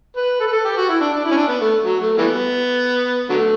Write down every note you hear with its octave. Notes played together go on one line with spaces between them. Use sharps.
B4
A4
B4
A4
G4
F#4
E4
D4
D4
E4
C#4
D4
B3
A3
F#3
A3
E3 G3 B3
D3 F#3 A3